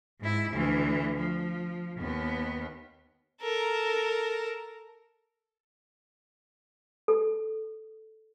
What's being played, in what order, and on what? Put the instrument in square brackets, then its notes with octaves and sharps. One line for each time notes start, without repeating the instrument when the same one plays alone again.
[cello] G#2 E4
D2 E3
F3
D#2 B3
[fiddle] A4 A#4
[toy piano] A4